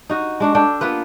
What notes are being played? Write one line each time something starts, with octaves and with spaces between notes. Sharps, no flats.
D#4 F#4 D#5
G#3 D4 F#4
D4 A4 G5
A#3 B3 F4 B4